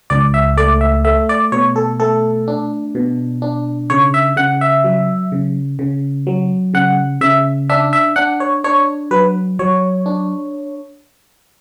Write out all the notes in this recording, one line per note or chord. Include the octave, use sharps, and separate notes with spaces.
C#2 D5
E5
A3 D5
E5
A3 E5
D5
B2 C#5
A4
A3 A4
D4
B2
D4
C#3 C#5
E5
C#3 F#5
E5
F#3
C#3
C#3
F#3
C#3 F#5
C#3 E5
D4 E5
E5
D4 F#5
C#5
D4 C#5
F#3 B4
F#3 C#5
D4